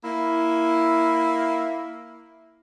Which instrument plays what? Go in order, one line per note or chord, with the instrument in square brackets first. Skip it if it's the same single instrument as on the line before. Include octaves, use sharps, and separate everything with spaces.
[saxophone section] A#3 E4